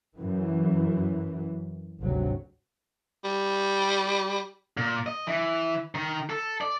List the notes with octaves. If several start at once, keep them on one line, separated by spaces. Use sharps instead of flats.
F#2 E3
G#1 D2 C3 F#3
G3
A#2
D#5
E3
D#3
A4
D5